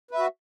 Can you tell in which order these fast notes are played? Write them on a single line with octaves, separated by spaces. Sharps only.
B4 E5 F#4